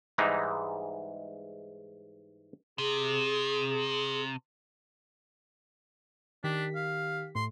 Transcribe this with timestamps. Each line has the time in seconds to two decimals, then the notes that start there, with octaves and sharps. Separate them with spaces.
0.18 G#2 E3 G3 G#3 D#4
2.78 C3 G#4
6.44 D#3 D4 G4 B6
6.75 F5
7.35 A2 C6